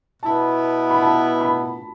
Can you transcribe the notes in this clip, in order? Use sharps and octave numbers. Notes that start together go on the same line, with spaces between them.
B2 B3 E4 A5
B5
A5
B5